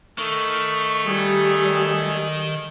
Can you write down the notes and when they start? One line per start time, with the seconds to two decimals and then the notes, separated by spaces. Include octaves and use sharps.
0.18 D#3 A3 C#6
1.06 G3 G#4